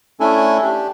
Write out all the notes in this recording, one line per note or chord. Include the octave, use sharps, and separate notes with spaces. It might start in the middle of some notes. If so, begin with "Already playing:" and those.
A3 C#4 D4 E4 A4 G#5
D4 G4